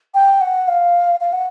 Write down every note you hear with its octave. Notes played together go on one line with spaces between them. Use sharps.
G5
F#5
F5
F5
F#5